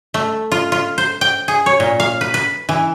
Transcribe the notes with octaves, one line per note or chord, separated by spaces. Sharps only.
A3
F4
F4
C5
G5
G#4
C#5
A#2
F5
B4
B4
E3